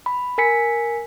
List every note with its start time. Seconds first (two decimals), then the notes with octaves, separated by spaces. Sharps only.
0.06 B5
0.38 A#4 G#5 B6 C#7